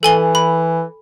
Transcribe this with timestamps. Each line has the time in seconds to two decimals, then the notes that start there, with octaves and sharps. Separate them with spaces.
0.03 E3 A4 G#5 G7
0.35 B5